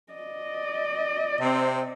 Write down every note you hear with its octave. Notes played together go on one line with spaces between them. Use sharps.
D5 D#5
C3 C4